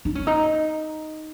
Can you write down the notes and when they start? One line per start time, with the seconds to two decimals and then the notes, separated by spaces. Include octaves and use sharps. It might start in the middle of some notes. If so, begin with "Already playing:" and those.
0.05 D#4
0.15 C#4
0.27 D#4